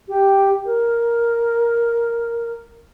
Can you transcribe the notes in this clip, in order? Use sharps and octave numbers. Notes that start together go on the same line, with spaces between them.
G4
A#4